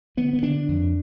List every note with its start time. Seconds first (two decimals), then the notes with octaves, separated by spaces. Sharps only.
0.17 D3 B3
0.33 B3
0.42 D3 D4
0.68 F2